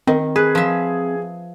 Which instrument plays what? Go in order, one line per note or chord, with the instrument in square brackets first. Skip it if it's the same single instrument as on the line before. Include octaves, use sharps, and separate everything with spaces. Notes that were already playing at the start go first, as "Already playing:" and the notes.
[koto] D#3 [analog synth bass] C4
[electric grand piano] G#4 [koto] B4
[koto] F3 E5